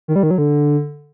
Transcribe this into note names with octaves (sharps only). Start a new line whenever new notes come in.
D#3
G3
D#3
F#3
D3